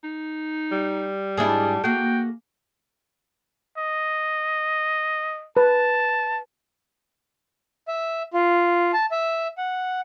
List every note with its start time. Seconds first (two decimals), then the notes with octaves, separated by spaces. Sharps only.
0.04 D#4
0.72 G3
1.37 G#2 D4 E4 G#4
1.84 A#3 F#4 G#4 G5
3.78 D#5
5.57 B4 A5
7.88 E5
8.33 F4
8.93 A5
9.11 E5
9.58 F#5